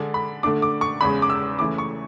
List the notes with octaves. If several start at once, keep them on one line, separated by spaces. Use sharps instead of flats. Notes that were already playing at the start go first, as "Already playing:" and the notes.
Already playing: D3 G#3 D4
B5
D3 A3 D4 D6
D6
C#6
E2 C#3 G#3 B5
D6
E6
C#3 E3 A3 E4 D6
C#6